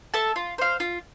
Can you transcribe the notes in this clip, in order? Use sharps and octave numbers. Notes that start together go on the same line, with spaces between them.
A4 E5 A5
F4
C5 F5
F4